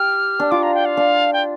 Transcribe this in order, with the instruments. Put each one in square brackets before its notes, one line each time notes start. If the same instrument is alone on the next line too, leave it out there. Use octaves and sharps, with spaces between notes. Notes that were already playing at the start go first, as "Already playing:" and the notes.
Already playing: [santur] G4 [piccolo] F6
[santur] D4
[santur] F4 [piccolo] D6
[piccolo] A#5
G5
F5
[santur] D4
[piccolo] G5